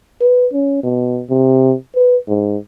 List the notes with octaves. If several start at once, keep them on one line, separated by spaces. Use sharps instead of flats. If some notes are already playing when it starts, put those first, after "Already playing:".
B4
C#4
B2
C3
B4
G#2